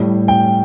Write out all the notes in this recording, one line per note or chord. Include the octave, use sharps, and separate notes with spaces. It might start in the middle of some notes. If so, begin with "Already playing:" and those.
Already playing: A2 G3
G5